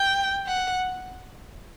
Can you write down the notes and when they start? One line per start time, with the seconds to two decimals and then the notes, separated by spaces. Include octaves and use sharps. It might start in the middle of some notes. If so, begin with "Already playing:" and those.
Already playing: G5
0.47 F#5